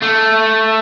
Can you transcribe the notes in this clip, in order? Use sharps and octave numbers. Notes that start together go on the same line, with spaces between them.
A3